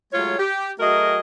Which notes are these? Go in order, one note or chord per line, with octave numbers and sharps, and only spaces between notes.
F#3 G#3 A3 F4 C#5
G4
F#3 A3 F#4 G#4 A#4 D#5